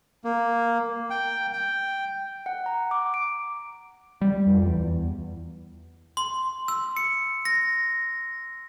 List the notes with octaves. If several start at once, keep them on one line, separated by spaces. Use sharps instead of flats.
A#3
G5
G5
F#5
A#5
D6
D7
G3
F2
E2
C6
E6
C#7
A#6